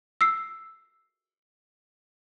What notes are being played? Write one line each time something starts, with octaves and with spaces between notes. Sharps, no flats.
E6 C7